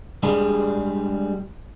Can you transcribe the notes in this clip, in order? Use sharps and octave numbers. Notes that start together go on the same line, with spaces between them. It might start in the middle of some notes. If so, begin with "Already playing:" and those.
G3 G#3 D4 G4 G#4